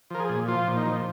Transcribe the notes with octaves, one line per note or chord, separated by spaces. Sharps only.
F3 A#4
G#4
A#2
F3 F4
A#2
D#4
F3